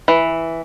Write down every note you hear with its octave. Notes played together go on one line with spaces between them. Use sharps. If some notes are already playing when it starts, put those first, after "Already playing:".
E3